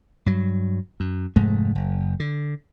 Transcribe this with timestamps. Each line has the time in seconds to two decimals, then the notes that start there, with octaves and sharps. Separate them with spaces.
0.26 G2 F#3
1.00 F#2
1.36 F1 G#2 G#3 A3
1.75 F#1
2.20 D3